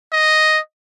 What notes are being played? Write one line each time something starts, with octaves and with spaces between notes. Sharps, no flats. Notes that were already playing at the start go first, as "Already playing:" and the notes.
D#5